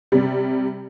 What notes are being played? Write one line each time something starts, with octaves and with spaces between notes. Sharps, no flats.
C3 G3